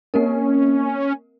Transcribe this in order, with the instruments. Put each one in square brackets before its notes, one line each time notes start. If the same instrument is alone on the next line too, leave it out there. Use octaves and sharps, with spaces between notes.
[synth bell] A#3 C4 A#4 [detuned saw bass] C#4